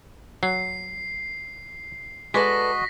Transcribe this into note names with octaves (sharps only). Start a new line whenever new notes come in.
F#3 C7
G#3 F#4 A4 B4 D5 D#5 A#6 B6